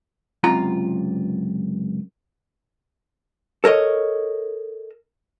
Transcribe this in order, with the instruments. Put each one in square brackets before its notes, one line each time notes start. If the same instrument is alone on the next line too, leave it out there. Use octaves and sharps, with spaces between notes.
[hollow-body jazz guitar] C#2 F#2 C3 F4 A#5
A4 A#4 C#5 D#5